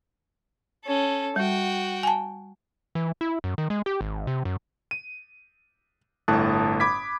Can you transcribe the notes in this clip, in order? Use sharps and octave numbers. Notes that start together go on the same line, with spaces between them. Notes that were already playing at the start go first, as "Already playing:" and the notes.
C#4 A4
G3 F#4 G5
G#5 A5
E3
E4
F#2
D#3
G#3
G4
G#1
C3
F#2
D#7
G1 A2 A5 D#6 F#6
B5 D6 G#6 B6